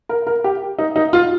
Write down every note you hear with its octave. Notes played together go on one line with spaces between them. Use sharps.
A#4
A#4
G4
D#4
D#4
F4